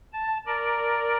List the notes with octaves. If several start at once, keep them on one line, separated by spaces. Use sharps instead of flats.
A5
A#4 D5